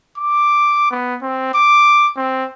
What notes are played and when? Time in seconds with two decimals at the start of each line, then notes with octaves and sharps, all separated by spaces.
0.18 D6
0.91 B3
1.22 C4
1.54 D6
2.17 C4